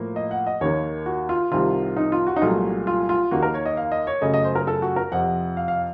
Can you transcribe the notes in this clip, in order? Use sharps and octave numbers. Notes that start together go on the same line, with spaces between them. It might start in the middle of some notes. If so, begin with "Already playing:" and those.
Already playing: A2 F3 A#3
D#5
F#5
D#5
D#2 D#3 A#3 C#5
F#4
F4
C2 C3 D#3 F4
D#4
F4
F#4
D#4
C2 A#2 F#3 A3 F4
F4
F4
D#2 D#3 A#3 F#4
A#4
C#5
D#5
F5
D#5
C#5
F#2 C#3 F#3 A3 D#5
D#5
C5
A#4
A4
F#4
A#4
F2 C3 F3 F#5
F5
F5